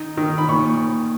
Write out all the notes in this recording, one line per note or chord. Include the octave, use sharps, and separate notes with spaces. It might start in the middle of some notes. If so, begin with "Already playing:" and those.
Already playing: D#3 D#4
D#3
B5
A#2 C#6